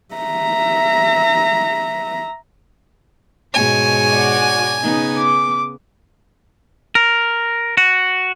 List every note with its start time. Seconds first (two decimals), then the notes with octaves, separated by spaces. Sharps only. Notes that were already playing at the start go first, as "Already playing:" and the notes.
0.15 E5 A#5
3.54 G#2 B2 C#5 G#5
4.12 F#4 D5
4.82 C#3 B3 D#4
5.18 D6
6.95 A#4
7.77 F#4